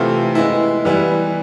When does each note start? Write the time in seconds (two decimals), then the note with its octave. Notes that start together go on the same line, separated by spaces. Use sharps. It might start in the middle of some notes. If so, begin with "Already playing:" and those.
Already playing: C3 E3 A3 C4 F4
0.35 G#3 B3 E4
0.85 E3 G3 B3 E4